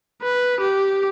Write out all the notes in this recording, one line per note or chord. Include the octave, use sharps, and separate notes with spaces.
B4
G4